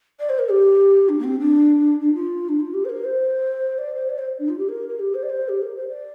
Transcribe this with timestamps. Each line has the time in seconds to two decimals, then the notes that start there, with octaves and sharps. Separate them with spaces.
0.19 D5
0.29 C5
0.39 A#4
0.49 G4
1.09 D4
1.18 A#3
1.23 C4
1.39 D4
1.99 D4
2.14 F4
2.49 D4
2.59 F4
2.73 G4
2.84 C5
2.89 A#4
3.04 C5
3.78 D5
3.94 C5
4.09 D5
4.18 C5
4.38 D4
4.48 F4
4.58 G4
4.68 A#4
4.88 A#4
4.99 G4
5.14 C5
5.23 D5
5.29 C5
5.48 G4
5.62 A#4
5.76 C5
5.88 D5